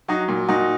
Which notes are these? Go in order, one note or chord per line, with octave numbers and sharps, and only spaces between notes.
F#3 D#4 F#4
A#2
A#2 D#4 F#4